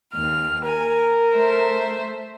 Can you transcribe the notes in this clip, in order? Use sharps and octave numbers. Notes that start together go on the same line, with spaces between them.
D#2 F6
A#4 G#5
A3 C5 E5